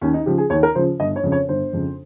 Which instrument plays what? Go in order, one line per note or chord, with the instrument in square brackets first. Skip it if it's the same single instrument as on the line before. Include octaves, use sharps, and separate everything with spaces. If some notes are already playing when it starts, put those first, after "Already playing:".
[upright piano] D#2 C#4
D#4
C#3 F3 G4
G#4
D#2 C#5
A#4
C#3 F3 C5
G1 D#5
C#5
F2 C#3
C#5
G1 C5
F2 C#3